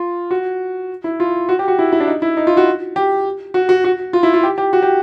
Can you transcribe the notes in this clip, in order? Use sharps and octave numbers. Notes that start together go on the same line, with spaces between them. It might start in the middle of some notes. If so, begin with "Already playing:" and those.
Already playing: F4
F#4
E4
F4
F#4
G4
F#4
E4
E4
D4
D#4
E4
D#4
F4
F#4
G4
F#4
F#4
F#4
F4
E4
F4
G4
G4
F#4
G4